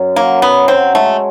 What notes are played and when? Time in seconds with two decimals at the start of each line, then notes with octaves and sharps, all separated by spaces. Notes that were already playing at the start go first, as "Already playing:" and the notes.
Already playing: F#2
0.16 F#3 A#3
0.42 F#2 B3
0.68 F#3 C4
0.95 G#3 A3